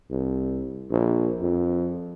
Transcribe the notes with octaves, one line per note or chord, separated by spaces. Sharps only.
C2
A#1
F2